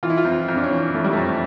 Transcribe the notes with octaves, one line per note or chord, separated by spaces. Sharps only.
E3 F4
E4
F4
F2
F2
D4
C#4
E3
E3 A3
G3
A3
F2